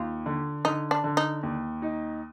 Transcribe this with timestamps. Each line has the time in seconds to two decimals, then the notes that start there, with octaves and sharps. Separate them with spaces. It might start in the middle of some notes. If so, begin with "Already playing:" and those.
Already playing: D#2 F4
0.26 D3
0.65 D3 D#4
0.91 D4
1.04 D3
1.17 D#4
1.43 D#2
1.82 D#4